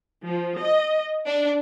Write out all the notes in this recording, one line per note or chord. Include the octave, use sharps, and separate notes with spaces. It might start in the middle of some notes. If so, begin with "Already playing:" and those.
F3
D#5
D4